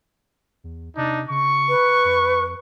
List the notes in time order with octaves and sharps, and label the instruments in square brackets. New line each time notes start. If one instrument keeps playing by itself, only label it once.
[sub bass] E2
[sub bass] C3 [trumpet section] D4 D#4
[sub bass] C#3 [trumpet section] C#6
[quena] B4
[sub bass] F2